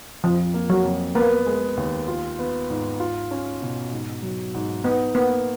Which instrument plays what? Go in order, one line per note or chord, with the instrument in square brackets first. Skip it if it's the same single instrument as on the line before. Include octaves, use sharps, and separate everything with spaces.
[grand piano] F2 [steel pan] F3
[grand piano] A#3
[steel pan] F#3
[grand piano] F2
[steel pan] A#3 [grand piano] B3
[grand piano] G#3
D#2
F4
B3
G#2
F4
C#4
B2
G#2
F#3
G#2
[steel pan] B3 [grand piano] D#4
[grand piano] A#3 [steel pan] B3